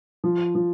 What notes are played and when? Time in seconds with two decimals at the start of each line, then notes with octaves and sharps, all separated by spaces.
0.24 F3
0.55 F3